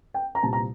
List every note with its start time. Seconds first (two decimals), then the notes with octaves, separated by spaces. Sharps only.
0.14 G5
0.35 A#5
0.43 C2 A#2 G3 C4 A5
0.53 A#5